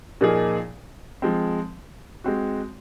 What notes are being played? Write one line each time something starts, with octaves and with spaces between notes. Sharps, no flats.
A#2 F3 A#3 D#4 G#4
F3 G#3 C4
G#3 C4 F#4